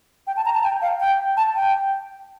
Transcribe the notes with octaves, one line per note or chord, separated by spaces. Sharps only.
G5
A5
A#5
A5
G5
F5
G5
A5
G5